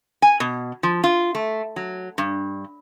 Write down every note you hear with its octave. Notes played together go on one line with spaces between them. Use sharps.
G#5
B2
F3
F4
A3
F#3
G2